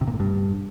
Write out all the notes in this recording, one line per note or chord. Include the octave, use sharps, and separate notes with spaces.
C3
A#2
A2
G2